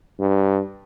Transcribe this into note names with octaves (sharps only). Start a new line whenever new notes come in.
G2